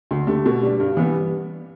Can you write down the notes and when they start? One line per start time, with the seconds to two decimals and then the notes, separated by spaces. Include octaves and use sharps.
0.11 D2
0.27 D3 A3 G4
0.46 B2
0.63 G3 D4
0.80 G2
0.97 E3 G3 B3